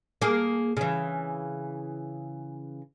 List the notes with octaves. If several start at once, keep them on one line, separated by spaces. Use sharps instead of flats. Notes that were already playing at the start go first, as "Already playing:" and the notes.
A#3 G#4
C#3 E3